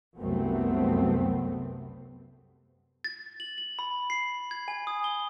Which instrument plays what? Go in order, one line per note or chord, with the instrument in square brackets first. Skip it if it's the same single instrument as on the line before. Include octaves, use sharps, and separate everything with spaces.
[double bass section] C2 F#2 C3 A3 B3 C4
[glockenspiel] A6
F#7
F#7
B5
C7
G#6
G#5
D#6
G7